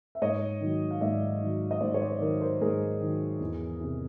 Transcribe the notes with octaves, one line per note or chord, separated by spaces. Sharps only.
E5
G#2 C#5 D#5
D#3 F#3
F5
G#2 D5 E5
D#3 F#3
D#5
G#2 C5 D5
C#5
C5 D5
D#3 F#3 A#4 C5
A#4 C5
G#2 G#4 A#4
D#3 F#3
E2
C3 E3